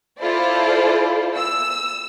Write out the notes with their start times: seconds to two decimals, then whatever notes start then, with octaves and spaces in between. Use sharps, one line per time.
0.20 E4 F4 A4 C5 D5
1.36 E6